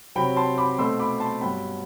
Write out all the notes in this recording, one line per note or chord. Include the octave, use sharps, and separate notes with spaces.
C3 F#3 C4 G5 B5
A5 C6
B5 D6
B2 A3 C4 C6 E6
B5 D6
A5 C6
G2 F#3 B3 G5 B5